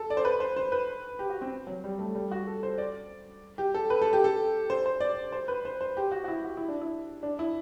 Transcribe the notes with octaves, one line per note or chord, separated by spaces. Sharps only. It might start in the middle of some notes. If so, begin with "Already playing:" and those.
Already playing: A4
D5
C5
B4
C5
C5
B4
G4
F#4
C4
F#3
G3
A3
G3
F#4
A4
C5
D5
G4
A4
B4
A4
G4
A4
C5
C5
D5
C5
B4
C5
C5
G4
F#4
F#4
E4
F#4
E4
D4
E4
D4
E4